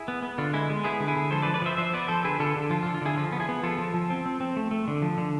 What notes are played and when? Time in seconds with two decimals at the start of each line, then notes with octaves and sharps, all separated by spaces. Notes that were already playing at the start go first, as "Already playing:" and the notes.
Already playing: E4 G#4
0.08 B3
0.23 B3
0.38 D3 F4
0.53 G#3 E4
0.69 G#3
0.84 B3 E4 G#4
1.00 D3
1.07 E4 G#4
1.16 D3
1.31 F3 A4 C5
1.42 B4 D5
1.47 F3
1.54 B4 D5
1.62 F3 C5 E5
1.77 F3 C5 E5
1.93 B3 B4 D5
2.08 F3 A4 C5
2.24 D3 G#4 B4
2.40 D3 F4 A4
2.56 D3
2.70 F3 F4
2.83 F4
2.86 D3
2.94 F4
3.01 D3 E4 G#4
3.17 F3 F4
3.32 B3
3.40 E4 G#4
3.49 B3
3.63 F3 F4 A4
3.78 F3
3.94 F3
4.10 C4
4.26 C4
4.41 C4
4.57 A3
4.71 A3
4.88 D3
5.02 F3
5.18 D3